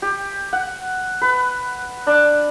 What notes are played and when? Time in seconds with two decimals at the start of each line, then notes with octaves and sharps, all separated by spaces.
0.02 G4
0.53 F#5
1.21 B4
2.07 D4